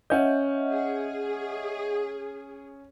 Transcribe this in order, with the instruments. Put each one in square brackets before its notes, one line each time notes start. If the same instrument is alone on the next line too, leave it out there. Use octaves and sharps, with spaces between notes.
[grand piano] C#4 G6 [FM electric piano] D#5 E5 F#5
[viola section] G#4